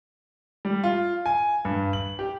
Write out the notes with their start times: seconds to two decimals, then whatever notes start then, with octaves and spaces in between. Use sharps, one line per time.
0.65 G3
0.84 F4
1.26 G#5
1.65 G2
1.93 F#7
2.19 G4